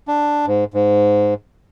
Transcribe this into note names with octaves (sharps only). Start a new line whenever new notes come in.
D4
G#2
G#2